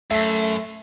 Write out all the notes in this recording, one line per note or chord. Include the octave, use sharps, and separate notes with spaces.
F#2 A3 E5